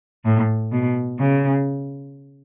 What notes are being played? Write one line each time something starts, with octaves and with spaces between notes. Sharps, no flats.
A2
B2
C#3